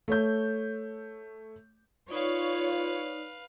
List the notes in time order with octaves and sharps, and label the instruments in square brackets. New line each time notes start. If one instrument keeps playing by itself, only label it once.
[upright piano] A3 C#5 G6
[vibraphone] D#4 D5 [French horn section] F4 [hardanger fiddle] B4 F5 [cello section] C#5